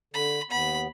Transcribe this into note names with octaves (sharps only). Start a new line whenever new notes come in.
D3 B5
D#2 B3 B5